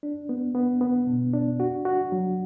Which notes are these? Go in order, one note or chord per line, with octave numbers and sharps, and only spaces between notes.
D4
B3
B3
B3
B2
D4
F#4
F#4
F#3